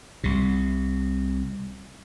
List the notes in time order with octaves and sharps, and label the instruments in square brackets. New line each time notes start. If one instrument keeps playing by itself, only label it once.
[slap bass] C2 C3